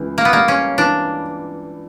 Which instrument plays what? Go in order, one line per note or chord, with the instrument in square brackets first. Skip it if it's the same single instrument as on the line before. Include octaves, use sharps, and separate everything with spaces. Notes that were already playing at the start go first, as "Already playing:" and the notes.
Already playing: [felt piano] C#2 E3
[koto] A#3
B3
[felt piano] G3 [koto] A#3
[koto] C#4
[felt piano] E3 [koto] D4